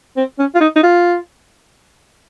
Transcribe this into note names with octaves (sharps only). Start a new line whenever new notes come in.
C4
C#4
F4
D#4
D#4
F4